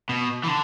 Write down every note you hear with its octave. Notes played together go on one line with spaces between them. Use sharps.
B2
E3
D3